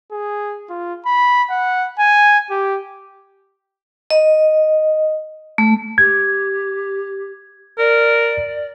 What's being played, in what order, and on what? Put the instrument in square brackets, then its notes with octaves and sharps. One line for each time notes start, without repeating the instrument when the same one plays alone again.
[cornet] G#4
F4
B5
F#5
G#5
G4
[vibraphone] D#5
A3
[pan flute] G4 [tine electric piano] G#6
[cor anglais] A#4 [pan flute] D5